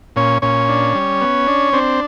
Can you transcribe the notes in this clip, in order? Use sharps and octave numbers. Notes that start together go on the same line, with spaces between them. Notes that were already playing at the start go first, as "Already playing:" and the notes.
A#2 C#4 C#5
A#2 C#4 C#5
D4
G3
B3
D4
C4 D4 C5